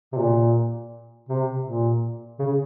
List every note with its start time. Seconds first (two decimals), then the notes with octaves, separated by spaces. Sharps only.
0.12 C3
0.17 A#2
1.29 C3
1.66 A#2
2.39 C#3